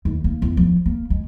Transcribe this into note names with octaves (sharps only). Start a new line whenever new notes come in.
D#2
A#3
E2
F3
A#3
G#3